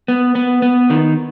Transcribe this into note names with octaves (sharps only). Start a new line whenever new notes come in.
B3
B3
B3
D#3